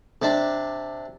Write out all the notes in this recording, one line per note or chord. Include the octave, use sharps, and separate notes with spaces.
C3 D4